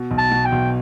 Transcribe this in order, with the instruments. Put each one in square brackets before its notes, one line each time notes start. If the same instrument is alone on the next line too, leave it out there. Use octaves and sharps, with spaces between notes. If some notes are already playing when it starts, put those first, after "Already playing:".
Already playing: [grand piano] B2
B1
[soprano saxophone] A5
[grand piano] B2
[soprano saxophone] G5
[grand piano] B1